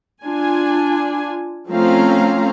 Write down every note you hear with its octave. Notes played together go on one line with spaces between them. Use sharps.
D4 F4 G#5
F3 A3 C4 C#4 F5 A#5